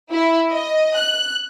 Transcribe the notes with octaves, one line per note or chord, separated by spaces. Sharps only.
E4
D#5
F#6